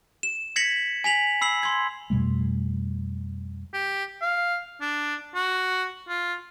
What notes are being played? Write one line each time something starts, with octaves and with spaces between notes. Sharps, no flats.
E7
G#6 A#6 B6 C#7 F#7
G#5 B6 F7 F#7
B5 E6 C7 F#7
C6 G#6
F2 B2 G3 A3
G4
F5
D4
F#4
F4